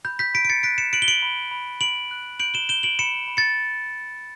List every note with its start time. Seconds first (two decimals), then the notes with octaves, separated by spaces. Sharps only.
0.05 B5 G6
0.19 G6 B6
0.34 B5 B6 D7
0.45 D7
0.49 A6 C#7
0.63 F#6 B6 D7
0.78 C#7 E7
0.93 F#6 D7 F#7
1.02 G7
1.08 D7 F#7
1.22 B5
1.51 B5
1.81 B5 D7 F#7
2.11 F#6
2.40 G6 D7 F#7
2.54 E7 G7
2.69 G6 E7 G7
2.83 D7 F#7
2.99 B5 C#7 E7
3.28 B5
3.37 A6 C#7